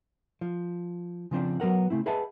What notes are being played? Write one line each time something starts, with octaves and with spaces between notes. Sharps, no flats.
F3
C#3 F3 C4 D4
F#3 B3 A#4 F#5
C#3 A3 C4 E4
G#4 B4 D#5 E5 F#5 A5